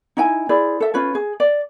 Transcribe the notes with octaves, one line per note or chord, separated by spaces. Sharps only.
D#4 E4 G#5
E4 G#4 C5 D5
A4 E5
C#4 F4 B4 C#5
G#4
D5